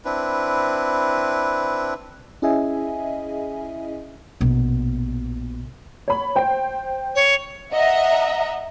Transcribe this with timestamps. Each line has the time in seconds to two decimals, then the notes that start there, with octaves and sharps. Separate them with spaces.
0.05 C4 D4 E4 B4
2.42 C#4 E4 G#4 D#5 E5 G#5
4.41 A#1 B2
6.08 C#5 B5
6.36 C5 G5
7.15 C#5
7.73 D#5 E5 F#5 A#5